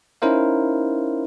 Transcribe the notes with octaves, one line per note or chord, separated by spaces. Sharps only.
C#4 D#4 E4 A#4 C5 F5